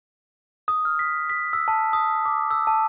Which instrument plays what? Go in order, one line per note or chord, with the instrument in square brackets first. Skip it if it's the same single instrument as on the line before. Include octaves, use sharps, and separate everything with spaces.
[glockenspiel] D#6
F6
B6
B6
E6
A5
D#6
D6
E6
A5